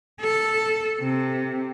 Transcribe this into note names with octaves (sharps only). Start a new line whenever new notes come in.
A4
C3